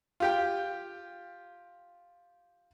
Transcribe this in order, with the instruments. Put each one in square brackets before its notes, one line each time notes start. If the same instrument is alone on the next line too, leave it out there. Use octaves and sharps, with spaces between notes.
[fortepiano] F4 G4 G5